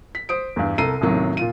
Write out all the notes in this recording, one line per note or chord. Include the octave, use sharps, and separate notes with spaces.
B6
C5 D#6 D7
E2 G2
C2 A4 A#5 C7 D#7
A1 D#2 C3 D#3 F#3
A#2 F4 D#7